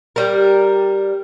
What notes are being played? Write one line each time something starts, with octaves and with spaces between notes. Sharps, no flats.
G3 A#4